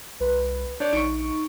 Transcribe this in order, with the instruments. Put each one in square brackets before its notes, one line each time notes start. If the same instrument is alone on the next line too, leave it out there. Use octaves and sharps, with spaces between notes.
[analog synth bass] C2 [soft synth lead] B4
[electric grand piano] D4 C#5 D5 [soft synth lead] G6
[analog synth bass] A#1 [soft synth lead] D#4 [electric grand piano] C#6 C#7 D7